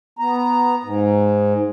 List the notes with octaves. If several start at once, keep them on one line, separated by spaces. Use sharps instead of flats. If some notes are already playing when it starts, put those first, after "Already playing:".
B3 A#5
G#2